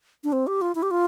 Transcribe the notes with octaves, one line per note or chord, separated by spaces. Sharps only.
D4
C4
G4
F4
E4
G4
F4